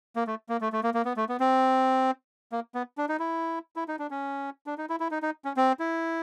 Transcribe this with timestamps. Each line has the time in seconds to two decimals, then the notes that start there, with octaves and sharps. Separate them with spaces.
0.16 A#3
0.27 A3
0.49 A#3
0.61 A3
0.73 A3
0.83 A#3
0.94 A#3
1.05 B3
1.17 A3
1.29 B3
1.40 C4
2.52 A#3
2.75 B3
2.98 D4
3.09 D#4
3.19 E4
3.76 E4
3.88 D#4
3.99 D4
4.11 C#4
4.67 D4
4.78 D#4
4.89 E4
5.00 E4
5.11 D#4
5.23 D#4
5.45 C#4
5.57 C4
5.79 E4